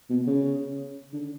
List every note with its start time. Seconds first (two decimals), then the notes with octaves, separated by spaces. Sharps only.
0.09 B2
0.27 C#3
1.13 D3